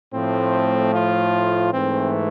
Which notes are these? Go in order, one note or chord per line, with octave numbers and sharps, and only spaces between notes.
A2 F3 A3 C4
F4
G#2 E3 A3 C4